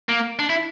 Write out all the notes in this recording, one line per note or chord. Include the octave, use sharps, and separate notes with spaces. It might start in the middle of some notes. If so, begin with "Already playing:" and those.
A#3
D4
E4